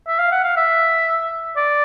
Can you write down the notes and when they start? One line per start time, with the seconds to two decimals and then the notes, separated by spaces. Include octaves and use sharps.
0.07 E5
0.19 F5
0.32 F#5
0.44 F5
0.57 E5
1.57 D5